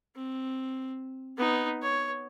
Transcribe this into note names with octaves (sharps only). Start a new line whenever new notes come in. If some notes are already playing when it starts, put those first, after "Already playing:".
C4
B3 D#4
C#5